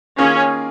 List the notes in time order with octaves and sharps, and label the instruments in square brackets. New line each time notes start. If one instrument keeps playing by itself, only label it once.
[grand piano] D#3 A#3 F4 G#4 [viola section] C#4